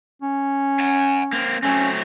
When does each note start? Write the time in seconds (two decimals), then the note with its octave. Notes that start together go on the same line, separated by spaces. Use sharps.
0.22 C#4
0.80 F#5 G#5
1.33 A#3 C4
1.63 F#3 A3 C4 C#4